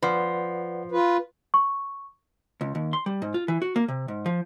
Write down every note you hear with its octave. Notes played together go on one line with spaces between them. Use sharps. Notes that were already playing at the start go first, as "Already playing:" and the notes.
F3 B4 D5 F#5
F4 B4
C#6
C#2
D#2
C6
G3
G#2
F4
E3
F#4
A#3
C3
G#2
F3